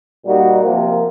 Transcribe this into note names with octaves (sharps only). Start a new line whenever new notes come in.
A#2 G3 A#3 D#4 F#4
C3 F3 A#3